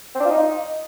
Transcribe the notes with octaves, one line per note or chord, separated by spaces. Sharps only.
C4
D4
F4
D#4